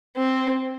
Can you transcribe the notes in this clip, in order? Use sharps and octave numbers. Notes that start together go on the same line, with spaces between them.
C4